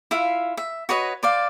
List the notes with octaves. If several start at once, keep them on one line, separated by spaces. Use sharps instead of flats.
E4 F4 E5 F5
E5
F#4 B4 C#5 D#5
C5 D5 F5